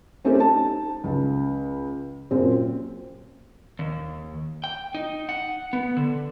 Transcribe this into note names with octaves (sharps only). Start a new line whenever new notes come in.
A3 C4 C#4 D#4 G4 A4
D#4 A5
C#2
F#2 A#2 C4
D#2
G5
D#4
F#5
B3
D3